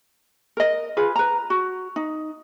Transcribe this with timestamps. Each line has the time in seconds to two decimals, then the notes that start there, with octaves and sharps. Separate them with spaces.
0.57 A#4 D#5
0.97 F4 G#4 B4
1.16 B4 A#5
1.50 F#4
1.96 D#4